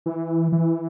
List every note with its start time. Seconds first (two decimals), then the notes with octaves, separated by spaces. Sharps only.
0.06 E3
0.52 E3